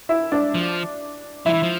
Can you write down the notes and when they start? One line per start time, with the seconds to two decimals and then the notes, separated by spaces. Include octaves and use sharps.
0.09 E4 E5
0.32 D4 D5
0.55 F3
1.46 F3 E4 E5
1.54 E3
1.63 F3